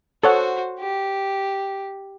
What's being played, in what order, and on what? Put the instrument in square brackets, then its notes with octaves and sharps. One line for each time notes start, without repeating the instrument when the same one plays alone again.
[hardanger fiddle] F#4 C5 [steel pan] A4 C#5 F#5
[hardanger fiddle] G4